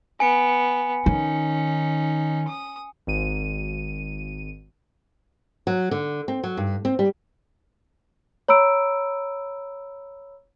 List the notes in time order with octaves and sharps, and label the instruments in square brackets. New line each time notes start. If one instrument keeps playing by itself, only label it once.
[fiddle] B3 [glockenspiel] G#5 C#7
[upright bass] D#3 [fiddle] C#4 D#4
[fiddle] D#6
[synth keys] G#1 D#7
[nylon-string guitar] F#3
D3
C4
F#3
G2
C4
G3
[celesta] C#5 A#5 B5 E6 D7